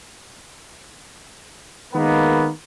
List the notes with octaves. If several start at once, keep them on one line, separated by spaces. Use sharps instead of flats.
D#3 G#3 A#3 B3